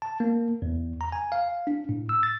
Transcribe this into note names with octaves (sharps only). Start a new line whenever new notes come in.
A5
A#3
E2
A#5
G#5
F5
D4
A2
E6
A6